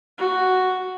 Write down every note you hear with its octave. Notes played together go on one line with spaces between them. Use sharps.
F#4